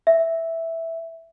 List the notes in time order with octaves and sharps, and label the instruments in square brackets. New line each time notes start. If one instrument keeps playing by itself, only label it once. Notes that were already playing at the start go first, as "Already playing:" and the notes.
[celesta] E5